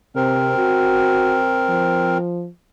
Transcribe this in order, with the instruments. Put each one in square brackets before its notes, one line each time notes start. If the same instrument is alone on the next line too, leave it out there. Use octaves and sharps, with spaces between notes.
[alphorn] C3 [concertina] C4 A#4
[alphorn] F#4
F3